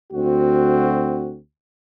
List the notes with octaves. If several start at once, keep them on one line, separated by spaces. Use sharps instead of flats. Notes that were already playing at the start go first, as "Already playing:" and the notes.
D2 C4 F#4